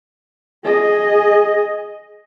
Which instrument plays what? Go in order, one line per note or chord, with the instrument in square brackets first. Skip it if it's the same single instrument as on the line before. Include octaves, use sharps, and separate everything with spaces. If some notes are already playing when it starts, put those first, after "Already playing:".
[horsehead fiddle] G#4 D#5